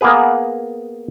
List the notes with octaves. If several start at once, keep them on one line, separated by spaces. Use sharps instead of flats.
A#3 B3 G#4 B4